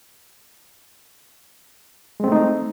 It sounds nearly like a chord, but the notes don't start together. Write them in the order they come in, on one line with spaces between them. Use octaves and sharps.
G#3 C4 A3 D#4